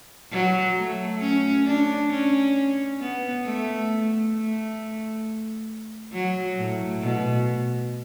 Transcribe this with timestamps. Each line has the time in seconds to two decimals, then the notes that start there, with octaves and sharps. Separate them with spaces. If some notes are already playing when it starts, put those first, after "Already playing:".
0.32 F#3
0.76 A3
1.21 C#4
1.66 D4
2.11 C#4
3.00 B3
3.44 A3
4.34 A3
6.12 F#3
6.57 A2
7.02 B2